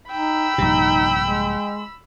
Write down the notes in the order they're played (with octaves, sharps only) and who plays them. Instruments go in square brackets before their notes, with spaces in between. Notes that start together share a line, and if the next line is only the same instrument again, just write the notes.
[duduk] D#4 [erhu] G5 [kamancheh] B5 E6
[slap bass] A#1 G2 C3 [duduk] D#4
[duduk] G#3